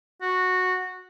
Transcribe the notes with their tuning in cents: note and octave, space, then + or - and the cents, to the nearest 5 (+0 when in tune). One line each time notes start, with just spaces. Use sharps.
F#4 -10